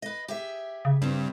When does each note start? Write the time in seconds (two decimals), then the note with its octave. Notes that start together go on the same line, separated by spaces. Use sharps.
0.02 B4 D#5
0.28 G4 G#4 E5
0.85 C#3
1.02 G2 C4 E4